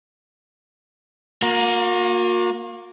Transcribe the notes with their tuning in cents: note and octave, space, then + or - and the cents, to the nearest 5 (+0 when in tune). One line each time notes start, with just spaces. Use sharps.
A#3 +0 F#4 -45